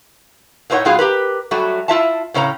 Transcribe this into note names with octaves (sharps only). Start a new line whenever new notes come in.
A2 A3 D#4 C5 C#5 F#5
A2 F#3 B3 F4 G#4 F5
G4 A#4 B4
F#3 G3 A3 F#4
E4 F4 E5 A5
A2 C#3 C#4 D#5 A#5